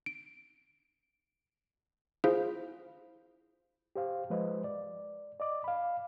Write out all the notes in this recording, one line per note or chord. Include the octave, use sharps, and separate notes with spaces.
D7
E4 F4 G#4 C5 F5
G4 C5 F5
F3 G#3 B4 C5 D#5
D5
D5 D#5 D6
F5 B5